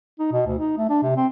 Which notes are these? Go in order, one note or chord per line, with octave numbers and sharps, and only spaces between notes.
D#4
B2
D2
D#4
A3
D4
C3
C4